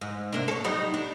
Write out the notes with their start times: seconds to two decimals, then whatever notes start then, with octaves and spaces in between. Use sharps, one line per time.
0.01 G#2
0.33 C3 A#3 D4
0.48 A4 C#5
0.64 F#3 G3 D#4
0.94 D4